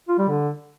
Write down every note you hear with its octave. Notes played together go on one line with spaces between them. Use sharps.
F4
G3
D3